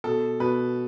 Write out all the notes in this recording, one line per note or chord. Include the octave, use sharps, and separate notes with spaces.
B2 A4
B2 B4